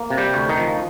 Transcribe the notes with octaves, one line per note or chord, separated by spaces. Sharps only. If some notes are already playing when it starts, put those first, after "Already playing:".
Already playing: A#3
C3
G3 G4
D2
D#3 D#4
F3